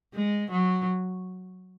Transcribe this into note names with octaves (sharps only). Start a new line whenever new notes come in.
G#3
F#3